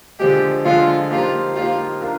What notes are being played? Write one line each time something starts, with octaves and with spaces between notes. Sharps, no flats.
D3 F3 G#3 G4
D3 F3 G#3 F4
F3 A#3 D#4 F4 G4
F3 A#3 D#4 F4 G4
D4 F4 A#4